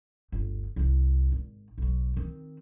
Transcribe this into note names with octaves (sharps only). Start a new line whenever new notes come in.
G1 D2
C2 C3
G#1
B1 F#3
D#3 C4